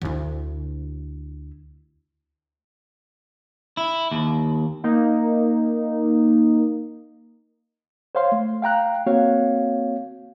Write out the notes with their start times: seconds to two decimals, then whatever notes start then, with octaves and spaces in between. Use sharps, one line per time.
0.02 D2 E4
3.77 E4
4.11 D#2
4.84 A#3 D#4
8.15 C5 C#5 F5 C6
8.32 A3
8.62 F5 G5 A#5 F#6
9.06 A#3 C4 F#4 C#5 F5